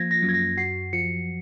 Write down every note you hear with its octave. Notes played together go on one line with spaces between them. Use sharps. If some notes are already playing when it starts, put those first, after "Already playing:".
Already playing: F3 A#3 F4 G#6 A#6
A#6
F#2
G#6
A#6
F#4 C7
F3 C#7